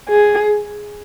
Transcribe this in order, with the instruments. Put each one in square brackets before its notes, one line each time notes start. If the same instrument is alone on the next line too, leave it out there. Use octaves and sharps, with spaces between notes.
[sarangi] G#4